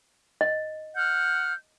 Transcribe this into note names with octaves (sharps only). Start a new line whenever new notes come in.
D#5
F#5 F6 G6